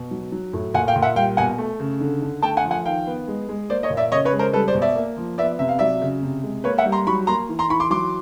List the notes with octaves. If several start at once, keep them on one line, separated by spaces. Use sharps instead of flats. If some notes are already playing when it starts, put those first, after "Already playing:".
Already playing: B2
F#3
F#3
A2
A#2 F#5 G#5
F5 G5
A#2
E5 F#5
G3 F5 G5
B2 F#5 G#5
A3
C#3
D3
D3
A3 G5 A5
F#5 G#5
F3
F#5 G#5
D#3 F5 G5
B3
G#3
G#3
A#3 C5 D5
C#5 D#5
A#2
D5 E5
C#3 C#5 D#5
B4 C#5
G#3
A#4 C5
G3 A4 B4
C5 D5
B2
D5 E5
A#3
F3
B3 D5 E5
C3 E5
F5
F#3 D5 E5
C#3
C3
G#3
A#3 B4 C#5
E5 F#5
G3
A#5 C6
F#3 B5 C#6
A#3 A#5 C6
E3
A#5 C6
E3 B5 C#6
C6 D6
F#3 C6 D6